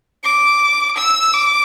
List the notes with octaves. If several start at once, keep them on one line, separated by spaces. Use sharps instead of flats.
D6
E6
D6